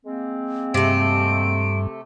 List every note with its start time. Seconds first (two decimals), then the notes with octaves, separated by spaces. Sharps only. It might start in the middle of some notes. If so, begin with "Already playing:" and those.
0.05 G#3 A#3 C4
0.74 G2 C3 A3 D7